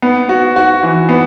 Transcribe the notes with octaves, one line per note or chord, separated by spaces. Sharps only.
B3
F#4
F#4
E3
B3